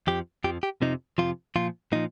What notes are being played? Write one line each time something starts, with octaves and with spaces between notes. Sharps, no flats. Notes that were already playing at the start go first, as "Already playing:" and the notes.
F2 F3 G4
F2 F3 G4
G4
F2 C3 F3 D#4
F2 C3 F3 F4
A#2 F3 F4
A#2 F3 D#4